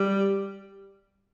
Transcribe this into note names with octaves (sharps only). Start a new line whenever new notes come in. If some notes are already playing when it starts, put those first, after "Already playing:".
Already playing: G3